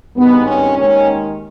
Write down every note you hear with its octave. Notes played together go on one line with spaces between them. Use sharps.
G#1 G2 D#3 G#3 B3
C#4
D#2 D#3 G#3 C#4